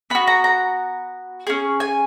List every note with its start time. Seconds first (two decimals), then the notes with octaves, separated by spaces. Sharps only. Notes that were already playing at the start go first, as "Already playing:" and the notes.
0.10 B3 F#4 B5
0.27 A#5
0.44 A#5
1.47 C#4 G#4
1.80 G#5